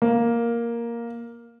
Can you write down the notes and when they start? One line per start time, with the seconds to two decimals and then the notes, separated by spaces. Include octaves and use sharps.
0.02 A#3